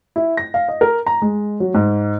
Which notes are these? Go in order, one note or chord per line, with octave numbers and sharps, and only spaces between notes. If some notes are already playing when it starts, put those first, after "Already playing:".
E4
A#6
F5
D#5
A#4
A#5
G#3
F#3
G#2